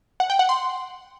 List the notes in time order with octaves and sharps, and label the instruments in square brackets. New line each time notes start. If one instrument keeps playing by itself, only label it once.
[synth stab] F#5
G5
F#5
C6